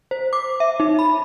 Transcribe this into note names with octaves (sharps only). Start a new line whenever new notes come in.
C5
D6
E5
D#4
B5